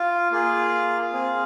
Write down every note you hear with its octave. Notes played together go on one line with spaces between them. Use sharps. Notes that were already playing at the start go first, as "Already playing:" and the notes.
Already playing: F4 F5
A#3 F4 G#4
C4 G#4